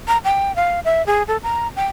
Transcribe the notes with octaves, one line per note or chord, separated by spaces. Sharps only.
A#5
G5
F5
E5
G#4
A4
A#5
G5